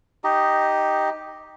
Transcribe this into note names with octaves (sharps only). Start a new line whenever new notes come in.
D#4 G4 D#5